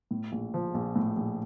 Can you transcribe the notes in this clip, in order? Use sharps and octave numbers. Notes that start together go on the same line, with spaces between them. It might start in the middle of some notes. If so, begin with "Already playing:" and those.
A2
A#1
F3
A#1
A2
A#1